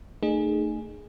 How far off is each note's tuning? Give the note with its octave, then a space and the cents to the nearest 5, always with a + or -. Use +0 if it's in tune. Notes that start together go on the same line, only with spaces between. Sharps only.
A3 +35 D#4 -30 G#4 +0